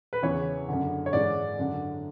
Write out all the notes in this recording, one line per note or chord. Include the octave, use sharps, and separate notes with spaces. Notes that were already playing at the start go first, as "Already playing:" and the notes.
B4
E2 C#3 E3 C#5
F#2 D3
C#5
G#2 E3 D5
F#2 D3